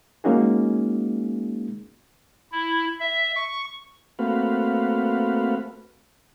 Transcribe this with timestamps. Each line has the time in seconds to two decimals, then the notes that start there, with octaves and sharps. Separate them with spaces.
0.24 G#3 A#3 C#4 D#4 F#4 G#4
2.52 E4
3.00 E5
3.36 C#6
4.19 A3 A#3 C4 F#4 B4 F5